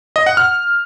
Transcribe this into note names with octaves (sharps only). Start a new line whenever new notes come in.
D#5
F#5
F6